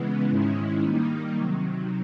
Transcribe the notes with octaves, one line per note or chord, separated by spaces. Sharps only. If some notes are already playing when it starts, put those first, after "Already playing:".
Already playing: C#3 E3 G#3 B3
G#2 D#3 G#3 C#4 E4
D#3 G3 A#3 D#4
C3 D#3 F#3